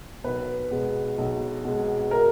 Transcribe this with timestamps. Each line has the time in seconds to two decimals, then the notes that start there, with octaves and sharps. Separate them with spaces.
0.24 B1 B4
0.71 B2 G#3
1.18 B1
1.64 B2 G#3
2.11 A#4